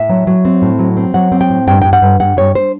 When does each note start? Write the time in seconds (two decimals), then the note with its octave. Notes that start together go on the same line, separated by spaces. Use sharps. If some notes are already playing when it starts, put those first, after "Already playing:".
Already playing: A2 E5
0.09 F#3
0.27 F#3
0.45 C4
0.62 A2
0.79 F#3
0.97 C4
1.14 F#3 F#5
1.32 C4
1.41 G5
1.50 A2
1.67 G2 G5
1.82 G2 G5
1.93 F#5
2.02 G2
2.20 G2 F#5
2.37 G2 C#5
2.55 C5